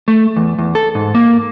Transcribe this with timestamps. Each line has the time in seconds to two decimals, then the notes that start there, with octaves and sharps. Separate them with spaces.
0.08 A3
0.36 E2
0.58 E2
0.75 A4
0.95 G#2
1.15 A#3